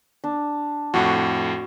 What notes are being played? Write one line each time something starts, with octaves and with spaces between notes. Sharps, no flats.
D4
F2 A2 F#4